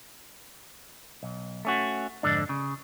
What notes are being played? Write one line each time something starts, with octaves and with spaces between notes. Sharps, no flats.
B1
A3 C#4 F#4
F2 G#2 D3 D4
C#3